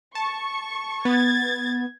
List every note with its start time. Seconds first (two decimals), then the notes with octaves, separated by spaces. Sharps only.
0.15 A5 C#6
1.05 B3 G#6 A6